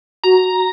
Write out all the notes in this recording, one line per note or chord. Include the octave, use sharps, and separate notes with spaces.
F#4 A#5